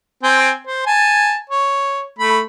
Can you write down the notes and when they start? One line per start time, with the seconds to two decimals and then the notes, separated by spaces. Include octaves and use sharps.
0.23 C4 G5 G#5
0.67 C5
0.86 G#5 A5
1.50 C#5
2.19 A3 B5